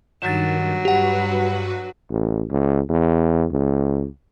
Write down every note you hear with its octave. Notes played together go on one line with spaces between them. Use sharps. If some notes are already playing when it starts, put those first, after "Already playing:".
G2 D#3 F#3 A6 E7
G2 F#4 G4 B4 F#5
A1
C#2
E2
C#2